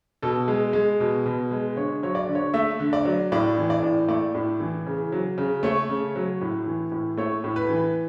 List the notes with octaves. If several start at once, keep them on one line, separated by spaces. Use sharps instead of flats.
B2 A4
G#3
G#3
B2
B2
G#3
D3 C#5
F#3 C#5
D5
D3
C#5
A3 E5
D3
D5
F#3
A2 D5
E3
D5
A2
A3 D5
A2
E3
C#3
F#3
C#3
A3 C#5
C#3
F#3
A2
E3
A2
A3 C#5
A2
B4
E3